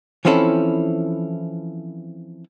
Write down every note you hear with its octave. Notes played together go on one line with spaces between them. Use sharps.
E3 F3 C4 C#4 E4 A4